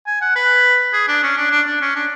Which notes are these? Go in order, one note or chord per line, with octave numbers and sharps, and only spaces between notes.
G#5
F#5
B4
G#4
D4
C#4
D4
D4
D4
C#4
D4